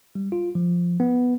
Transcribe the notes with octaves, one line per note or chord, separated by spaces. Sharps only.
G3
F4
F3
B3